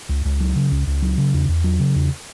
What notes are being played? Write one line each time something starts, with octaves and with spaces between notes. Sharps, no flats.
C#2
C#2
F#3
C#3
C#2
C#2
F#3
C#3
E2
E2
F#3
C#3
E2